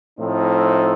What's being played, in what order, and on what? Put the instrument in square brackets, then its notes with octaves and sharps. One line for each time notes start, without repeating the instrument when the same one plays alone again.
[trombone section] A2 F3 A3 C4 D#4